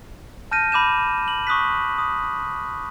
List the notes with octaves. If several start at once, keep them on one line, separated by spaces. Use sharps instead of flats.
A5 F6 G6 A#6 D#7
B5 D6 G6 E7
F#7
C#6 D#6 F#6 B6
D#6